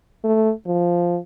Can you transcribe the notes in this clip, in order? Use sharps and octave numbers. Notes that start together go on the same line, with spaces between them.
A3
F3